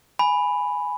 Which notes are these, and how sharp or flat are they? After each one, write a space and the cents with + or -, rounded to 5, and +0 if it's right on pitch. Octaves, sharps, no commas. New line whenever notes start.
G#5 +0 B5 +0